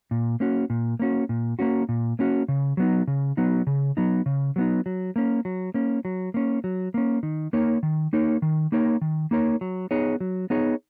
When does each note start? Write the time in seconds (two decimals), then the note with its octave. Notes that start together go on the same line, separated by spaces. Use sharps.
0.11 A#2
0.40 A#3 C#4 F#4
0.70 A#2
0.99 A#3 C#4 F#4
1.29 A#2
1.59 A#3 C#4 F#4
1.89 A#2
2.19 A#3 C#4 F#4
2.48 C#3
2.77 F#3 B3 D#4
3.07 C#3
3.37 F#3 B3 D#4
3.67 C#3
3.97 F#3 B3 D#4
4.26 C#3
4.56 F#3 B3 D#4
4.86 F#3
5.16 A#3 C#4
5.45 F#3
5.74 A#3 C#4
6.05 F#3
6.34 A#3 C#4
6.64 F#3
6.94 A#3 C#4
7.23 D#3
7.53 A#3 D#4 A#4 C#5
7.83 D#3
8.13 A#3 D#4 A#4 C#5
8.42 D#3
8.72 A#3 D#4 A#4 C#5
9.01 D#3
9.31 A#3 D#4 A#4 C#5
9.61 F#3
9.91 B3 D#4 G#4 C#5
10.20 F#3
10.50 B3 D#4 G#4 C#5